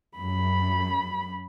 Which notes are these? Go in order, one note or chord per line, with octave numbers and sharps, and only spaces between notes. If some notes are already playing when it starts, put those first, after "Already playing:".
F#2 B5